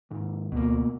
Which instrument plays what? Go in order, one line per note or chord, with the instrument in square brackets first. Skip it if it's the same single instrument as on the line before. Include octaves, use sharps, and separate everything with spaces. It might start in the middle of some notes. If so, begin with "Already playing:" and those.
[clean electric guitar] D#2 G#2
[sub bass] D2 [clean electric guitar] B2 A#3